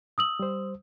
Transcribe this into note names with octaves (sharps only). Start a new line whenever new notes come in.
D#6 E6 F#7
G3 C5